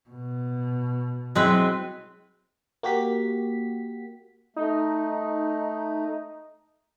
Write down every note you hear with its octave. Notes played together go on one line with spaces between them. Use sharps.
B2
F#3 G#3 C4 E4 B4
A#3 F#4 G4 B6
A3 D#4